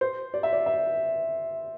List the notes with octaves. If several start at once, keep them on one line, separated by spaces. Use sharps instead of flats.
C5
D5
E5
D5
E5